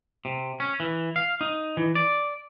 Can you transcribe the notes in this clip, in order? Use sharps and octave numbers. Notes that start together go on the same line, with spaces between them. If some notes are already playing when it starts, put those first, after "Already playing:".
C3
C#4
E3
F5
D#4
E3
D5